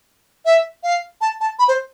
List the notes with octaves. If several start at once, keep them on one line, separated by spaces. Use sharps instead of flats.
E5
F5
A5
A5
B5
C5